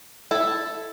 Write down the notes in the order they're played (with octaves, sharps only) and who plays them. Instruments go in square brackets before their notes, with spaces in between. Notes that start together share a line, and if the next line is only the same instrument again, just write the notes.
[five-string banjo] E4 A4